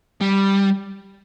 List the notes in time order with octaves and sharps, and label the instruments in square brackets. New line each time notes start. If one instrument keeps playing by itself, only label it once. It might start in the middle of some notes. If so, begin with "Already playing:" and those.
[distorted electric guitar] G3